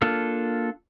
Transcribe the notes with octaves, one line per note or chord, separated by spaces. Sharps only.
A#3 D4 F4 A4